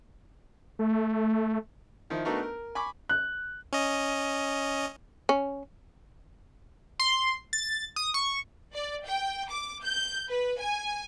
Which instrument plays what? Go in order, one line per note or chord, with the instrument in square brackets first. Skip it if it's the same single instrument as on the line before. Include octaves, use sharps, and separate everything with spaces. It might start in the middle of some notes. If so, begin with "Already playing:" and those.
[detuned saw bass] A3
[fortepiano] D#3 F3 E4
A3 B3 D4 D#4 F#4 A#4
A#4
G#5 B5 C#6 D6
[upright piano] F#6
[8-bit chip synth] C#4 D#5
[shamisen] C#4
[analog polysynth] C6
A6
D#6
C#6
[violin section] D5
G5
D6
G6
B4
G#5